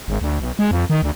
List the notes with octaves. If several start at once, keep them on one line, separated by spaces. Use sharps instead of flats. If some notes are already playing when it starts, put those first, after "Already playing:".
G#1
D2
B1
G#3
F2
D#3
D2